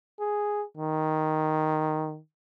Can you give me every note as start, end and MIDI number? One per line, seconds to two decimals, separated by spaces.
0.19 0.64 68
0.77 2.19 51